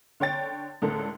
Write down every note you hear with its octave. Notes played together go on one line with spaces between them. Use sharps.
D3 C#5 G5 A6
C#2 A2 D3 A4 A#4